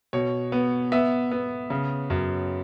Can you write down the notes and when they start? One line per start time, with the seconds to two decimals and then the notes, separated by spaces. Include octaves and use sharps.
0.13 B2 C#5
0.52 B3
0.92 B3 E5
1.31 B3
1.70 C#3
2.10 F#2